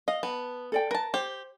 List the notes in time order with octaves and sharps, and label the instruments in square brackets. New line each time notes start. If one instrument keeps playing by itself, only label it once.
[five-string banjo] D#5 [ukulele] F5
[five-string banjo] B3 [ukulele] A5
[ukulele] A4 D5 G5
[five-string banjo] A#4 A5 [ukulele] B4
[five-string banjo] G4 [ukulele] C5